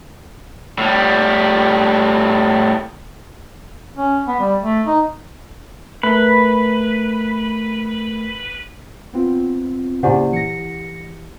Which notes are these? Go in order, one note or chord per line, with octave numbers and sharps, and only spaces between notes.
A2 G3
C#4
B3
G3
A3
D#4
A3 A#4 B4
B3 C4 F4
A#2 C#3 E4 G4 C5 D5 F#5 G#5
E3 A#6 C#7